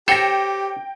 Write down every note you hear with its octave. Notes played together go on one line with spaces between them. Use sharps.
G4 A4 C5 C#5 G5 A#6